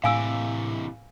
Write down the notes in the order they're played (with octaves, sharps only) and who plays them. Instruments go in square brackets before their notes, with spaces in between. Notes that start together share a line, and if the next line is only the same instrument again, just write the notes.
[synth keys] A2 [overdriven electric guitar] C3 E3 [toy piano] F5 G#5 E6